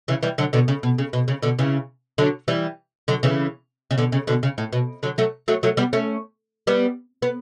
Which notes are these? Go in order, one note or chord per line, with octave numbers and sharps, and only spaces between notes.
C#3 E3
E3 G3
D3 F#3
B2 D3
C#3
B2
C#3
B2
C#3
B2 D3
C#3 E3
D3 F#3
E3 G3
D3 F#3
C#3 E3
C#3
B2 D3
C#3
B2 D3
C#3
A2
B2
D3 F#3
F#3 A3
F#3 A3
F#3 A3
G3 B3
A3 C#4
G3 B3
B3